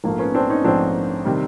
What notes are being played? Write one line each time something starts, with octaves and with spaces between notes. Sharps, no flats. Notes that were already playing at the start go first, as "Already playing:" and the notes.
A#1 G#2 F3 A3 A#3
B3 C#4
C4 D4
C#4 D#4
A#1 G#2 F3 A3 C4 D4
C3 D#3 G3